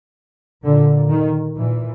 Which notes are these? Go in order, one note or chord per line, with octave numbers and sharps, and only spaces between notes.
A#2 D3
D#3
A#2 E3